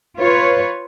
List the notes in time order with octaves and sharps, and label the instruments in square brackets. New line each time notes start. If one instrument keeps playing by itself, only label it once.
[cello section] F4 B4 C#5